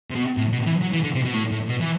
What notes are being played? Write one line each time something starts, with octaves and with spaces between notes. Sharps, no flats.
C3
B2
A2
B2
E3
F#3
E3
D3
C3
B2
A2
A2
B2
E3